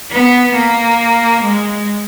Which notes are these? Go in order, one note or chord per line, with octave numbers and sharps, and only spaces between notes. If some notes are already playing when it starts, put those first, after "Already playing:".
B3
A#3
G#3